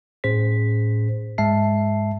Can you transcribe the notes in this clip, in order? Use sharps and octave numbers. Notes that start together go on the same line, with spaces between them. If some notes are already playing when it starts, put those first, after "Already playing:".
A2 C#4 G#4 C5 B6
G#2 G#3 E5 A5 C7